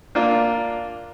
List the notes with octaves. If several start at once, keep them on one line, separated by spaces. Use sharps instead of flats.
A#3 D4 F4